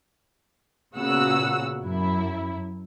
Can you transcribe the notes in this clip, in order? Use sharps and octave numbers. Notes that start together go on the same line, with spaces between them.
A#2 C#3 B3 F#4 F#5 E6
F#2 E4